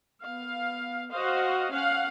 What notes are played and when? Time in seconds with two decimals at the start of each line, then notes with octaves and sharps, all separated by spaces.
0.22 B3 F5
1.11 F#4 C5 D#5 F5
1.72 C#4 F5 F#5